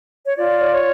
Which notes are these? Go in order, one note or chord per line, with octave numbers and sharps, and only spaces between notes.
C#5
F4 D5
C#5
C#5